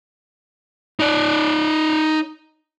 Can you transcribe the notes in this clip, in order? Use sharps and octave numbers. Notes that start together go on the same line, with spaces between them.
D#4 D5